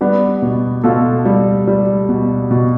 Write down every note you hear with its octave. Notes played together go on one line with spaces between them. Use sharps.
G3 B3 D4
B2
B2 F4 A4
G3
G3
B2
B2